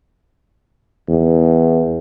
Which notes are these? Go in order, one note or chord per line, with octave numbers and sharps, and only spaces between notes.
E2